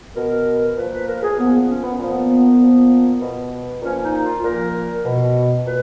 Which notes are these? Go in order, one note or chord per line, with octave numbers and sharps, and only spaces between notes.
B2 A#4
A#2 F3 B4
B4
A#4
G#4
A#2 F3 B3
B3
C#4
B3
A#2 F3 B3
A#2 F3
B2
A#2 F3 C#4
D#4
F4
A#2 F3 A#4
B2
A#2 B4